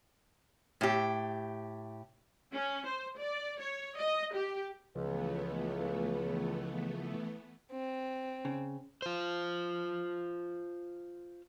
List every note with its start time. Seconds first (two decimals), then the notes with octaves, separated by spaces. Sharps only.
0.81 A2 G4
2.53 C#4
2.86 C5
3.19 D5
3.60 C#5
3.97 D#5
4.34 G4
4.96 C#2 C#3 E3 F3 A3 B3
7.72 C4
8.45 C#3
9.02 F4 C5